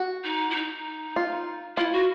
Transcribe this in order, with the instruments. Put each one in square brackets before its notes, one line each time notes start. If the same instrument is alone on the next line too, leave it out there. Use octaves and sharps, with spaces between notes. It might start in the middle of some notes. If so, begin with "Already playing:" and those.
Already playing: [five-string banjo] F#4
[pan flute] D#4
E4
D#4
[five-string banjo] F4
[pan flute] E4 [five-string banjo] F4
[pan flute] F#4